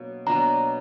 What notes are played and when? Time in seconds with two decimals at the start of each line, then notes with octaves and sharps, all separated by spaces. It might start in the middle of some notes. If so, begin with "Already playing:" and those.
Already playing: B2 F#3 A#3 D4
0.26 B2 F#3 A#3 D4 A#5